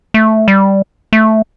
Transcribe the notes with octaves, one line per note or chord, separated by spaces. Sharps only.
A3
G3
A3